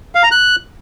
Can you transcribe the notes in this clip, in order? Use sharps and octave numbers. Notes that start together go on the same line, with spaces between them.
F5
A#5
F#6